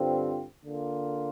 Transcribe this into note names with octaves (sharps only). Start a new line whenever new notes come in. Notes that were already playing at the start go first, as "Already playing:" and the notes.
Already playing: G2 D3 G3 C4 F4
D3 A#3 F4